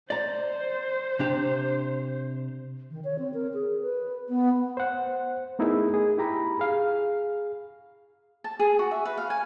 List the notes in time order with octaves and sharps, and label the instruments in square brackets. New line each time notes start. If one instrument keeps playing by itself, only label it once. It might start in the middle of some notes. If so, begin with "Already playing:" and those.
[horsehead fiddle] C5 [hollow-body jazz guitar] D5 A#5
[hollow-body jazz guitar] C3 D4 G4
[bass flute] D#3
C#5
C4
A#4
G#4
B4
B3
[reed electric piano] C5 F#5
A3 B3 D#4 E4 G#4 A#4
G#4
E4 G4 A#5 B5
G#4 F5
[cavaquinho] A5
G#4
F#4
E5
B4
F5
G#5